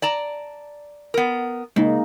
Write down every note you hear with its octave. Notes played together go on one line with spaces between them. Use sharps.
D5 A5 A#5
B3 A#4
C#3 G#3 A#3 D#4